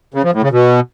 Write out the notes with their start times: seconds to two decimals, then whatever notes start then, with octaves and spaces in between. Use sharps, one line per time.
0.14 C#3
0.24 F3
0.33 A2
0.42 C#3
0.52 B2